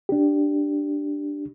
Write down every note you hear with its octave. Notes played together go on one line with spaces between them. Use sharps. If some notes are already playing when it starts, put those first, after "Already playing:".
D4 G4